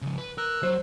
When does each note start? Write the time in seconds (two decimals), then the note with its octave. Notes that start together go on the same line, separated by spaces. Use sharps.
0.02 C#3 F3
0.18 B4
0.38 A#4 E6 F#6
0.63 F#3 C5